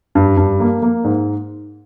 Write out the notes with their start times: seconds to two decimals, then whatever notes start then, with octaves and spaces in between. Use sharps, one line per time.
0.15 G2
0.37 G2
0.60 A#3
0.82 A#3
1.04 G#2